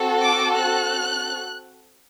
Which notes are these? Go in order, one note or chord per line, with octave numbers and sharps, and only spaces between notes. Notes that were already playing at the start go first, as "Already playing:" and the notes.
Already playing: C4 F#4 A4
D6
F#6